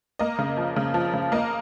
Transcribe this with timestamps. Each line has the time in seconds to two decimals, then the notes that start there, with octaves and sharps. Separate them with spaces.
0.19 A#3 D#5
0.39 C#3
0.57 F3
0.76 C#3
0.94 F3
1.14 C#3
1.32 A#3 D#5